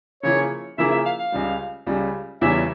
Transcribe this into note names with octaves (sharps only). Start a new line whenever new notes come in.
C#3 F3 A#3 E4 G#4 C#5
C#3 F3 A#3 E4 G#4 E5
E5
F5
F5
C#2 C#3 G3
C#2 C#3 G3
E2 C#3 G3 C#4 E4 E5